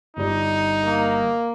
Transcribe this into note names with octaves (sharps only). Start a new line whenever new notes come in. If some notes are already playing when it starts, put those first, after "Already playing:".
G1 G3 D#4
A#3